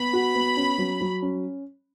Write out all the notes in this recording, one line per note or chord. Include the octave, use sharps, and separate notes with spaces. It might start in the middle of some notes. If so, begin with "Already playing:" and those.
Already playing: B3 B5
F#4
B3
C#4
F#3
F#3
C#4